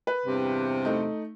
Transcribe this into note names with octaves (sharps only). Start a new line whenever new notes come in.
B4
E2 G2 C3
A3 D#4